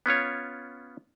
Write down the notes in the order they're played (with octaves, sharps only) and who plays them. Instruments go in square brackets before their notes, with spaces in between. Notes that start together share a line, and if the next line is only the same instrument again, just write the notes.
[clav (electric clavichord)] B3 C#4 F4 C#5